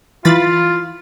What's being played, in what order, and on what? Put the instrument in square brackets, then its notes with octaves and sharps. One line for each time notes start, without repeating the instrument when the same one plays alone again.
[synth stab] E3 B5 A6 [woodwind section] F4